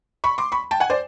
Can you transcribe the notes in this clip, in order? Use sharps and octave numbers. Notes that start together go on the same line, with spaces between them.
B5 C#6
C6 D6
B5 C#6
G5 A5
F#5 G#5
C5 D5